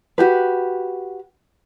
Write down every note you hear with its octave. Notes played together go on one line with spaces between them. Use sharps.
F#4 G4 B4